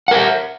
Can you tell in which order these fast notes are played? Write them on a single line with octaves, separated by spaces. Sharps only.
F#5 A#4 E5